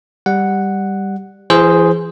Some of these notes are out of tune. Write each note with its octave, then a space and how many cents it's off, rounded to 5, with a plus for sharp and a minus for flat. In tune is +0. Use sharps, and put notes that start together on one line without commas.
G3 +5 F#5 +0
E3 +35 G#4 +0 C5 +0